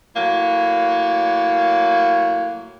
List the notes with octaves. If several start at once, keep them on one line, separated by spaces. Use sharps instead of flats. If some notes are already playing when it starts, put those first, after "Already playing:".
A2 F#3 A#3